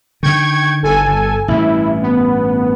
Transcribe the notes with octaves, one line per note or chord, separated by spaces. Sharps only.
D3 D#3 G5 C#6 G#6
G1 A4 G#5
A1 G2 E4
B3